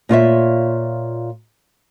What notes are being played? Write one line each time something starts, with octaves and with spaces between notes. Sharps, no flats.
A#2 F4 C#5 E5